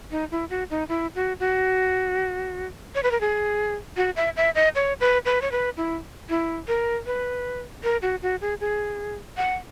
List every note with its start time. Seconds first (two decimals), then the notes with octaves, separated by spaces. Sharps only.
0.11 D#4
0.31 E4
0.50 F#4
0.70 D#4
0.89 E4
1.15 F#4
1.40 F#4
2.95 C#5
3.03 B4
3.11 A#4
3.21 G#4
3.97 F#4
4.16 E5
4.37 E5
4.55 D#5
4.75 C#5
5.00 B4
5.25 B4
5.42 C#5
5.52 B4
5.77 E4
6.30 E4
6.68 A#4
7.06 B4
7.84 A#4
8.02 F#4
8.22 F#4
8.41 G#4
8.60 G#4
9.37 F#5